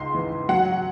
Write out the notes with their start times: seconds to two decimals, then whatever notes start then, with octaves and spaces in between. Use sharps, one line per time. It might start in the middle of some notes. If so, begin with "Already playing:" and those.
Already playing: C#2 G#2 C6
0.14 E3
0.49 F#3 F#5